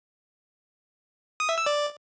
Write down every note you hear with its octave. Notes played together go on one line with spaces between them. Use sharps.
D#6
E5
E6
D5